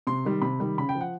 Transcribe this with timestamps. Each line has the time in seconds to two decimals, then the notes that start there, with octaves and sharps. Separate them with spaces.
0.07 C3 C6
0.25 D#3 G3
0.42 C3 B5
0.60 D#3 G3
0.78 C#3 B5
0.89 G5
0.95 F3
1.01 F#5